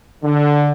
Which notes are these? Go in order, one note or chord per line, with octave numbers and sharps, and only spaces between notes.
D3